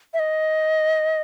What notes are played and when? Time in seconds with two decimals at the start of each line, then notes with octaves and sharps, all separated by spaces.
0.14 E5
0.19 D#5